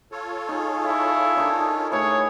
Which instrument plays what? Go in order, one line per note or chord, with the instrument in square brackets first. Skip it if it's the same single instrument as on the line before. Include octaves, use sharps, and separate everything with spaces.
[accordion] F4 A4 C#5
[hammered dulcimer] D#4 G#4
[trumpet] E4 [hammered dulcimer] F5
[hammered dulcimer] D4 D#4 A#4
[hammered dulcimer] A2 G#4 B4 [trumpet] C#5